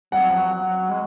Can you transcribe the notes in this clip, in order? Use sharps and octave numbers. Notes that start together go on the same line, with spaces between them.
G3 F#5
F#3
F3
F#3
G#3